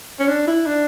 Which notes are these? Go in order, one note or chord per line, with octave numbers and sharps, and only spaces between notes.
C#4
D4
E4
D4